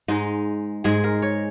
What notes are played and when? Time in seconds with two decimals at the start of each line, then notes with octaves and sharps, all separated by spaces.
0.08 G#2 G#3 D#4
0.84 G#2 G#3 G#4
1.04 A#4
1.22 C#5